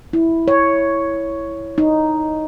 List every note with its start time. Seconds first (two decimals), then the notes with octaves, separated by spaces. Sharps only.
0.13 E4
0.48 C#5
1.78 D#4